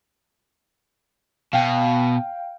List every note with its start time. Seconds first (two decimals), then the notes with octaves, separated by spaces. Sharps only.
1.53 B2 F5 G5